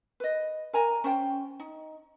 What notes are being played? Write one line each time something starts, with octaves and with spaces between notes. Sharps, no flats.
B4 D#5
A#4 G#5 A#5
C#4 C5 G5
D#4